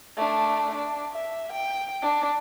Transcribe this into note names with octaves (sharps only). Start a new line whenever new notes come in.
A3 D4
D4
E5
G5
D4